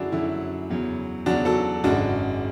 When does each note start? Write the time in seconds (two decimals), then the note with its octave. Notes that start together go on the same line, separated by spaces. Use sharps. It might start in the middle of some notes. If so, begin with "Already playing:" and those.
Already playing: F#2 D3 F#3 D4 E4 F#4 G#4
0.12 F#2 D3 F#3 E4
0.70 E2 C#3 F#3
1.26 E2 C#3 F#3 D4 F#4
1.45 F#4 A4
1.84 G#1 F#2 C#3 G#3 D4 F#4